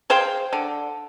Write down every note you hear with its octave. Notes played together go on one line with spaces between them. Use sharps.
G#4 C5 F5 G5
D3